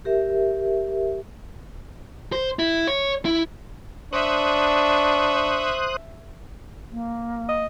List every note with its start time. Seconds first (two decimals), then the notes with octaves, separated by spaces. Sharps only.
0.05 G4 A#4 E5
2.32 C5
2.59 E4
2.88 C#5
3.25 E4
4.13 D4 C5 E5 C#6 D#6 F#6
6.91 A#3
7.49 D#5